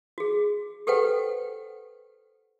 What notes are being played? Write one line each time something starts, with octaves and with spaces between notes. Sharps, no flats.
F#4 G#4
G4 A4 B4 C5 F#5 G5